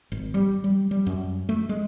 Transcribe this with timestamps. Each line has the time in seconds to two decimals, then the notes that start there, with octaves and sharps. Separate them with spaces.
0.12 G#1
0.34 G3
0.64 G3
0.91 G3
1.06 F#2
1.49 A3
1.69 G#3